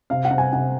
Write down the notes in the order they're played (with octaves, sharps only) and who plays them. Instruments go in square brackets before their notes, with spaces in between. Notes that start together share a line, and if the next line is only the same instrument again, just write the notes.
[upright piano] C3 [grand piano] F5
[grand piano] F#5
[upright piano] C3
[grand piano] G#5
[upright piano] C3 [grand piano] F#5